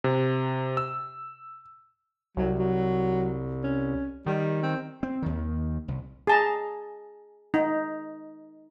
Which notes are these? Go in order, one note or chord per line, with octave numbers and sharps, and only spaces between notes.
C3
E6
C2 F#3
F#3
C#4
D#3 G3
C4
C4
D#2 D#3
C2
G#4 A5 A#5
D#4